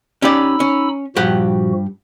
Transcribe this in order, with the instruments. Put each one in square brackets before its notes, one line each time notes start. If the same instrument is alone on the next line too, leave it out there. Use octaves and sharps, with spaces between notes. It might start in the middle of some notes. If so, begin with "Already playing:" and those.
[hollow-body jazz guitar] C#4 G4 D5 [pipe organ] D#4 B5 E6
[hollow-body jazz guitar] C#4
[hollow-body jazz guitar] G2 G4 F#5 [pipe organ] A#2 F3 F#4